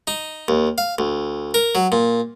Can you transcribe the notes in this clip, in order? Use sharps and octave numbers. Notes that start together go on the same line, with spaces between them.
D#4
D#2
F5
D2
A#4
F#3
A#2